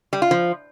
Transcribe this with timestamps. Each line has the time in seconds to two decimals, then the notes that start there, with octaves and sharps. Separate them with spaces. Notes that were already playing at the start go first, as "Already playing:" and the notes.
0.13 G3
0.22 F4
0.31 F3